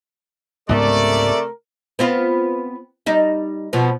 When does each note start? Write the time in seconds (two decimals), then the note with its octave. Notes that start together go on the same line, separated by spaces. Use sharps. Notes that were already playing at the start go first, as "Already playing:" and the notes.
0.69 C#2 G#2 C3 A3 B3 A#4 D5
1.99 B3 C4 F4
3.06 G3 D#4
3.73 B2 F3 B3